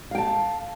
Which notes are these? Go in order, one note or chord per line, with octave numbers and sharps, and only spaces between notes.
F5 G5 A5